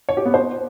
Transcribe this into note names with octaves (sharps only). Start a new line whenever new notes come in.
C#5
G4
B3
C5